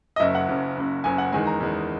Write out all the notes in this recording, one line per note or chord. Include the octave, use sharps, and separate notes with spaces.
D#5
F#1 F#2 C#3 E5
F#5
F#1 F#2 C#3
F#1 F#2 C#3
F#1 F#2 C#3 G#5
F#5
E2 D#3 G#3 G#5
A#5
E2 D#3 G#3